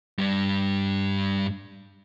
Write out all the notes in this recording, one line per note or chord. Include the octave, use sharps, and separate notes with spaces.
G2 G3